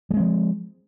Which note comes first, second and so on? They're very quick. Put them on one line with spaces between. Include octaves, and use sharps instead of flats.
G3 G#3 C4 F3